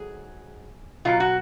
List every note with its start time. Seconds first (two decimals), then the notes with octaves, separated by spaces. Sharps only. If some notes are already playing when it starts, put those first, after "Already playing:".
Already playing: G#2 F#3 G#4
1.05 B2 F#3 F4
1.20 F#4